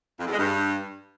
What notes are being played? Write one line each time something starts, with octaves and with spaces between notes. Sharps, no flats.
F2
E2
G#3
G2